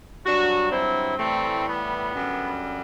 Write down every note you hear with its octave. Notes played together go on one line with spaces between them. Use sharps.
G2 F#3 D4 F#4
C4 E4
A2 E3 G3 A3 C4
B3
F#2 D3 G3